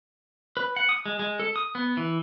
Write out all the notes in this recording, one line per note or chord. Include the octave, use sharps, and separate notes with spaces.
B4
F#5
D#6
G#3
G#3
A4
D#6
B3
E3